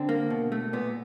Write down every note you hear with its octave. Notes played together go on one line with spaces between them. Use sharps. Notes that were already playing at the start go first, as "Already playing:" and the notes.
Already playing: D3 C4
A#3
B2
A3
A#2 B3